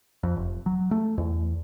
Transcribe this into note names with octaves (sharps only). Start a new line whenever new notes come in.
F2
F1
F#3
A3
E2